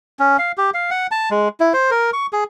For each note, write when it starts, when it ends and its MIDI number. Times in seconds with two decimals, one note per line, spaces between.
0.19 0.37 61
0.38 0.52 77
0.58 0.70 67
0.74 0.90 77
0.91 1.07 78
1.11 1.29 81
1.31 1.48 56
1.60 1.73 64
1.73 1.91 72
1.91 2.11 70
2.13 2.27 85
2.33 2.44 68